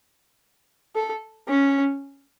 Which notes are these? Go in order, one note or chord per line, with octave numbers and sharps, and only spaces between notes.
A4
C#4